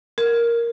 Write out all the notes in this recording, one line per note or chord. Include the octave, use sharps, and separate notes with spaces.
A#4